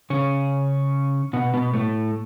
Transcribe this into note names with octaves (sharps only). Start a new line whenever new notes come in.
C#3 C#4
B2 B3
B2 B3
A2 A3